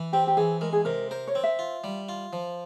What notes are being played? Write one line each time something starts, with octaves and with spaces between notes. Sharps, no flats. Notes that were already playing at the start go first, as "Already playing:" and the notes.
Already playing: E3
C4 G4
G4
E3 G#4
G#3 A#4
G#4
C3 A#4
A#4 C5
C#5
C4
E5
F4
G3
F4
F3